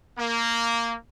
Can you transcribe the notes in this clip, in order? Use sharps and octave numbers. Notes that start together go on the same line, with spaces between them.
A#3